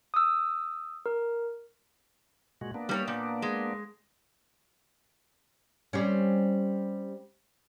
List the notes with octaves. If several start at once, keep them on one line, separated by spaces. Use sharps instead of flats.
D#6 E6
A#4
A#2 G#3 F#4
A#3 B3 D4
G3 A#4 C#5
A#2
G#3
G3 C4 C#4